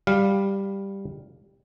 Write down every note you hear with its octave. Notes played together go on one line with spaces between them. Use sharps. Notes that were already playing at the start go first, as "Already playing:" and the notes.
G3 F5